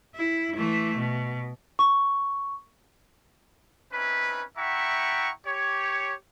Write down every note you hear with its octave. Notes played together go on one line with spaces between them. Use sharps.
E4
E3 A3
B2
C#6
C4 C#4 D#4 E4 B4
E4 E5 F#5 G5 A#5 C#6
G4 C#5